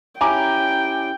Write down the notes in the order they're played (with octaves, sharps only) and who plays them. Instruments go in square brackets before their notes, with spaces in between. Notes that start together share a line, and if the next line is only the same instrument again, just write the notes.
[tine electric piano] C#4 E4 G4 [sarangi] G5 [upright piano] G#5 A#5 D6